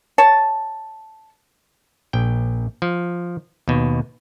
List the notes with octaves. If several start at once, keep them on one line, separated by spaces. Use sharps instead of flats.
C#5 A5
A#1 G5
F3
D#2 B2